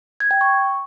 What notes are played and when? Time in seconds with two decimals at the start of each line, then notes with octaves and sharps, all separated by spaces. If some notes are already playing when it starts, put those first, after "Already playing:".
0.20 G#6
0.31 G5
0.41 C#6